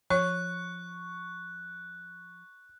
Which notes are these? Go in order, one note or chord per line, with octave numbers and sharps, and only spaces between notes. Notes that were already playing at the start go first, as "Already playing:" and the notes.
F3 C#5 C#6 F#6